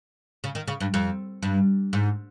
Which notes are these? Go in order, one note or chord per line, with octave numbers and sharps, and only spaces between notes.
C#3
D#3
C#3
G2
F2
G2
G#2